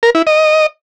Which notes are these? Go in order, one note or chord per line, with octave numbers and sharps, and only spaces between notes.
A#4
E4
D#5